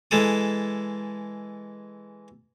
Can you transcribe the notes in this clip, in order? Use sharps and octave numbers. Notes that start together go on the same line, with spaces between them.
E3 G#3 A4 D#6